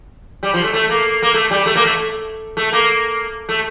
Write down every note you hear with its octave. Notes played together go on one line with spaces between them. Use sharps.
G3
F3
A3
A3
A#3
A#3
A3
G3
A3
A#3
A3
A3
A#3
A3